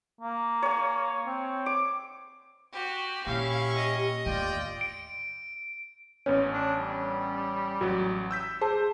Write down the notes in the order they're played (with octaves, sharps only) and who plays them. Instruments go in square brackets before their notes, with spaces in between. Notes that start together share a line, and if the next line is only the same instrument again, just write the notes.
[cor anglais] A#3
[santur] C#5 G#5
[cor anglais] C4
[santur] D6
[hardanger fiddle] F#4 G4
[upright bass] A#2 [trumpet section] C#4 E4 C#6 [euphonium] G4 [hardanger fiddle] F5
[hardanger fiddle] D#5
[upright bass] D#2 A2 [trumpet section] F4 D5 G5
[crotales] D7
[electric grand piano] A1 B3 C#4 [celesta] C#5
[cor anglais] D4
G3
[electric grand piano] A1 F#3 [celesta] F#4
[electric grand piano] E6 G6 B6
[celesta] G#4 A5 [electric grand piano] C5